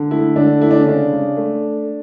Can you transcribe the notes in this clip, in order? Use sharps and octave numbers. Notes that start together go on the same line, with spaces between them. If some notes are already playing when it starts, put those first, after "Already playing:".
Already playing: D3
A3 E4
D3 D4
A3 E4
D4
C#4
C#3 D4
C#3
A3